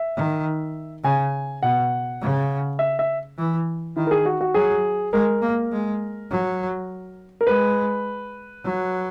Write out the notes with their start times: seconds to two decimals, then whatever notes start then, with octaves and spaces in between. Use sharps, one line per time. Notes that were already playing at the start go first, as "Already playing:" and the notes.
Already playing: E5
0.16 D#3
1.04 C#3 G#5
1.63 B2 F#5
2.21 C#3
2.79 E5
2.99 E5
3.38 E3
3.96 D#3 E4
4.07 A#4
4.11 G#4
4.25 F#4
4.41 F#4
4.54 F#3 G#4
5.13 G#3 A#4
5.42 A#3
5.72 G#3
6.30 F#3
7.41 A#4
7.47 G#3 B4
8.64 F#3